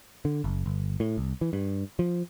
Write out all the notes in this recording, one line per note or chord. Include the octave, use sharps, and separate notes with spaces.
D3
F#1
G1
A2
C2
E3
G2
F3